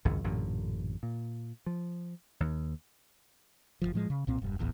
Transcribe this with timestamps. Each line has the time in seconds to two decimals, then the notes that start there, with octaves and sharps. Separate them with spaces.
0.05 G#1 C#2 F#2 F#3
0.24 A1 F#2 A#2 D3
1.03 A#2
1.66 F3
2.40 D#2
3.82 F#1 C2 F3
3.94 A2 F3 G#3
4.10 C#3
4.27 B1 A#2 C4
4.42 E1 G2
4.59 D1 A1 E2